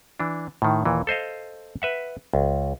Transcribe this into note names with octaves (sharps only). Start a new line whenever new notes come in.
E3 D4
A2 D#3
D#2 A#2 E3
A4 C5 D#5 F5
B4 E5 F#5
C#2